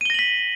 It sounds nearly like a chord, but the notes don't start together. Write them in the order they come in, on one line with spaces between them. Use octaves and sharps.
D#7 G7 A#6 F#7 B6